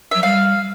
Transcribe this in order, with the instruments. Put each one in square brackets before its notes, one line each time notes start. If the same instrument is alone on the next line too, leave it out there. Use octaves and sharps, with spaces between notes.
[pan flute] F#3 [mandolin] E5
[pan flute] G3 [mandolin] F5